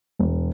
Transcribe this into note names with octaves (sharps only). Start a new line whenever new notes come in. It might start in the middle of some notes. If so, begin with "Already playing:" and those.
E1